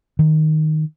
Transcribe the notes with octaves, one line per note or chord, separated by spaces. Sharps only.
D#3